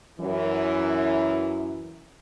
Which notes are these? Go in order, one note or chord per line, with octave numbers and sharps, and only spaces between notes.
F#2 E3